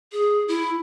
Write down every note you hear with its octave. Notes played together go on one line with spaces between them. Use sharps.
G#4
E4